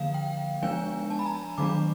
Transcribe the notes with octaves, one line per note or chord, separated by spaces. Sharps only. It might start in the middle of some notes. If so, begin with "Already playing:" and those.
Already playing: D3 F3 A#3 F5
G5
F3 G#3 B3 D4 G#5
A5
B5
A#5
D#3 F#3 A3 D4 D6